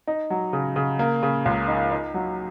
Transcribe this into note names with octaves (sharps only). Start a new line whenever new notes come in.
D#4
F#3
C#3
C#3
A#3
C#3
C#2
D#4
D#4
F#3